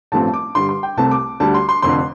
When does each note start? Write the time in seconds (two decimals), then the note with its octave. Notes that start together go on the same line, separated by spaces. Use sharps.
0.12 A1 G2 F3 A3 C4 A5
0.34 D6
0.55 G2 D3 G3 C6
0.69 C6
0.83 G5
0.97 C2 C3 A3 C4 A5
1.11 D6
1.40 D2 D3 G3 A5
1.54 C6
1.69 C6
1.82 F1 F2 D3 C6